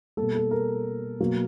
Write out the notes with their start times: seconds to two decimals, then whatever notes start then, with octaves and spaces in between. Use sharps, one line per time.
0.17 B2 G3 A#3 A4
0.35 A4
0.51 A#4
1.20 B2 F#3 A#3